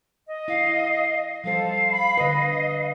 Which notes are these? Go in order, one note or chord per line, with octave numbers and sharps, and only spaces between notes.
D#5
E4 F5
F3 G3 A4 C5 F5
B5
D3 B4 D#5